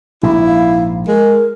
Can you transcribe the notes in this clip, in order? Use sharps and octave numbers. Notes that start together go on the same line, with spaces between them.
A#1 G#2 E4
F5
G#3 A#4